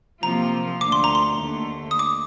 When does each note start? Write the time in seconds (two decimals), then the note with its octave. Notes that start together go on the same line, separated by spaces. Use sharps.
0.23 C3 F3 A#3 F4 A#5
0.81 D2 D3 A3 D6
0.92 C6
1.04 A#5
1.15 C6
1.40 D#2 D3 A3
1.91 D#6
1.99 D6